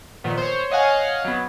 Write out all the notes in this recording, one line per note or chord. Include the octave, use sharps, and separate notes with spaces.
A#2 D#3 F3 B3
C5 C#5
C#5 D#5 F5 F#5 G#5
F#3 B3